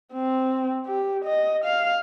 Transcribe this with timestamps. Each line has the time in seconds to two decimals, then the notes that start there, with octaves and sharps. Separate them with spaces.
0.13 C4
0.86 G4
1.25 D#5
1.64 F5